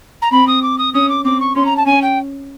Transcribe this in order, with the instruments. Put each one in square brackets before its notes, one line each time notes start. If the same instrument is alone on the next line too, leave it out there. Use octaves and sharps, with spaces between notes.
[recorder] A#5
[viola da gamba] C4 [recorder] B5
[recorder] D#6
D6
D#6
[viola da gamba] C#4 [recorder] D#6
[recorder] D6
[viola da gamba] C4 [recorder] D6
[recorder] C#6
[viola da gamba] C#4 [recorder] C6
[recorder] A#5
A5
[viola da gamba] C#4 [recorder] G#5
[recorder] G5